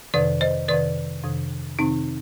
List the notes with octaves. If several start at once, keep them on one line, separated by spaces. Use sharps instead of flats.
F2 C3 D#3 B4 D5
C5 D#5
F2 C3 D#3 B4 D5
F2 C3 D#3
F2 C3 D#3 C4 D#4